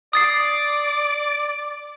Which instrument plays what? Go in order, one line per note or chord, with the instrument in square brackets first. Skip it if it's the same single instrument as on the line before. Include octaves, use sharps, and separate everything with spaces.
[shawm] D5 [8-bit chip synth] D#6 A6 C7